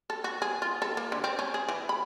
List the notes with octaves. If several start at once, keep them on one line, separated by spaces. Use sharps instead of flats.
A4
F#4
G#4
F4
A4
A#3
D3
C4
C#4
G#4
E3
B5